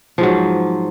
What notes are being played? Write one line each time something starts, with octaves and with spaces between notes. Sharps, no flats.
G#2 F3 F#3